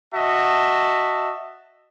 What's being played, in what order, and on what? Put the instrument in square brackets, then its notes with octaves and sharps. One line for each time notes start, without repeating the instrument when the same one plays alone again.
[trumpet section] F#4 D#5 E5 A5